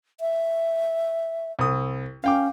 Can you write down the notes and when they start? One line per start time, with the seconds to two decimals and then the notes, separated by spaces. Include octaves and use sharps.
0.20 E5
1.59 C2 D#6
2.24 C#4 F5 G5 D6